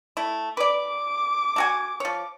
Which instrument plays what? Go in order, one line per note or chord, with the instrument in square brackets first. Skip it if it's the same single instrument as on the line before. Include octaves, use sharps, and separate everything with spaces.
[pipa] A3 E4
[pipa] B4 D5 [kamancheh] D6
[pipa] A3 F#4 G#5
F3 C#5